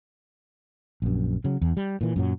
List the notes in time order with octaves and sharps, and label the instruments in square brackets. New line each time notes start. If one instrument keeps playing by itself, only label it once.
[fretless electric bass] A#1 F#2
C#3 F#3
E2
G3
A#2 E3
F#2 A#2 F#3